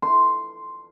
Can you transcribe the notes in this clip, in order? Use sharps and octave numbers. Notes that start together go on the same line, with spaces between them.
C6